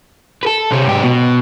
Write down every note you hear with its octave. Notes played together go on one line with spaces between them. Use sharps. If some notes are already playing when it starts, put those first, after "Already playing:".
A4 B4
C3 C#4
G#2 G4
B2